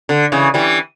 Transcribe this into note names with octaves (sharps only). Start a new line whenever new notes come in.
D3
C#3 E3
E3 G3